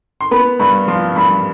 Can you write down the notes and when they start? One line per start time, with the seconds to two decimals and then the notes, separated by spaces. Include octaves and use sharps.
0.21 C6
0.31 B3 B5
0.60 G2 B5
0.88 F3 C6
1.16 G2 B5